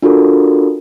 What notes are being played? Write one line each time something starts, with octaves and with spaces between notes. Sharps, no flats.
D4 F4 F#4 A4 A#4